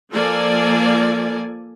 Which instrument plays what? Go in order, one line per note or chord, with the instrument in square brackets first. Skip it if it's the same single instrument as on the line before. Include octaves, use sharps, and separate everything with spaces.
[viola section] F3 A#3 A4 D5 G#5